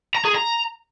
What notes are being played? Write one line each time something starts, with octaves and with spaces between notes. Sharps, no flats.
A#5
G#4
A#5